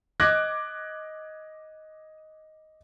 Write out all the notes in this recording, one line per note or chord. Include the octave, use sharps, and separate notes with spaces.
D#5 D6 F#6 G#6 A#6